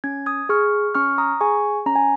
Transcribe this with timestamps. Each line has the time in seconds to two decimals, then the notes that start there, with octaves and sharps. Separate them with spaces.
0.04 C#4 G#6
0.26 D#6 G#6
0.49 G#4 C#6 F6
0.95 C#4 C#6 F6
1.18 A#5 D#6
1.41 G#4 G#5 C#6
1.86 C#4 A#5
1.96 G#5